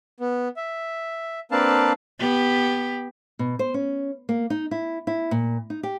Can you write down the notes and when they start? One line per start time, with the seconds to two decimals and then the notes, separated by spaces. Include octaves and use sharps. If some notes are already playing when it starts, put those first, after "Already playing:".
0.20 B3
0.56 E5
1.51 A#3 C4 D4 B4 F5 A5
2.19 B3 G4
3.39 B2
3.59 C5
3.74 C#4
4.29 A#3
4.50 D#4
4.71 E4
5.07 E4
5.31 A#2
5.70 D#4
5.83 G4